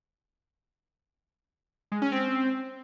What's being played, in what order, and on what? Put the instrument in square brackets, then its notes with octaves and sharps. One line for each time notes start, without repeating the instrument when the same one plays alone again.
[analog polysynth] G#3
C#4
C4